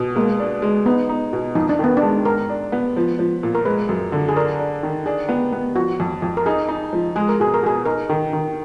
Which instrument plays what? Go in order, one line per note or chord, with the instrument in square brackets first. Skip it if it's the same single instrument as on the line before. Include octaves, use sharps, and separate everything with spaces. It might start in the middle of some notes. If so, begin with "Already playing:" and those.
Already playing: [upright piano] B2
[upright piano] G#3 [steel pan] A#3
[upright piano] D4
G#3
[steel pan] B3 [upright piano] D#4
[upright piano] D#4
B2
[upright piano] F2 [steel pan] D#4
[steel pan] D4
[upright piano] D#3 [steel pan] B3
[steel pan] D4
[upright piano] G#3
[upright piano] G#2 [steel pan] A#4
[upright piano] D4
B3
F3
F3
A#2
[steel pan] A#4
[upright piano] G#3 [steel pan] B4
[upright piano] F#2
D3
[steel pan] G#4
[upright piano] D4 [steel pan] A#4
[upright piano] D4
D#3
[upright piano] D4 [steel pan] G#4
[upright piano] B3
B3
[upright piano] F3 [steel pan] F#4
[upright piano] F2
F2
[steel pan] A#4
[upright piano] D#4 [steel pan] G#4
[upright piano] D#4
F3
[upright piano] G#3 [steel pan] G#4
[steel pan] A#4
[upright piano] B2 [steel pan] G#4
[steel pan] A#4
[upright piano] B2 [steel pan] G#4
[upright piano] D#4 [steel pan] A#4
[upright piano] D#3
D#3